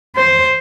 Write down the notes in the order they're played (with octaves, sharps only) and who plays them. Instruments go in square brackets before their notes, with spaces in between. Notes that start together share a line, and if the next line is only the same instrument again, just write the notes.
[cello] C5